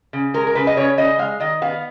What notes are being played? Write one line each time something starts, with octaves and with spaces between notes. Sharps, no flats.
C#3
G#3 A#4
A#4
C#3 B4
D#5
C#3 C#5
C#3 D#5
G#3 F5
D#3 D#5
B3 F5